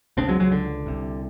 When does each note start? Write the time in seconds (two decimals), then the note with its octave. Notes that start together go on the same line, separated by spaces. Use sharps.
0.17 C#2 C#3 C4 D4
0.29 F#3 G#3
0.40 F#3 G#3
0.52 D3
0.86 C2 C3